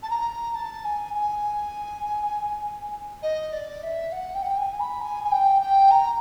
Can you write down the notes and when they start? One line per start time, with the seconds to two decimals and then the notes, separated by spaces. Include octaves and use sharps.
0.02 A5
0.10 A#5
0.54 A5
0.84 G#5
1.14 G#5
3.22 D#5
3.52 D5
3.82 E5
4.11 F#5
4.34 G5
4.42 F#5
4.48 G5
4.57 G#5
4.79 B5
5.01 G#5
5.23 G#5
5.31 G5
5.61 G5
5.90 A#5